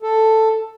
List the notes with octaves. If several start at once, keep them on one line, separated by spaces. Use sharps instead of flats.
A4